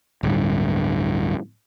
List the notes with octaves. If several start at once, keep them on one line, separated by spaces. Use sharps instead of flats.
D1 G2